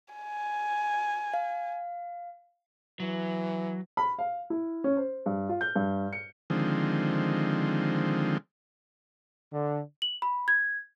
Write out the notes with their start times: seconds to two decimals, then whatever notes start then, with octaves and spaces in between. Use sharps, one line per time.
0.14 G#5
1.34 F5
3.00 E3 F#3
3.97 B5
4.19 F5
4.50 E4
4.84 C#4
4.96 C5
5.26 G2
5.49 F4
5.61 G6
5.75 G2
6.13 C#7
6.50 D3 D#3 F3 G#3 C4
9.52 D3
10.02 F#7
10.22 B5
10.48 G#6